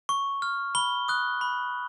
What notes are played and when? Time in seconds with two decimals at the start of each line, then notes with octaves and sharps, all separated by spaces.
0.09 C#6
0.42 F6
0.75 B5 G7
1.08 D#6 F#6
1.41 B5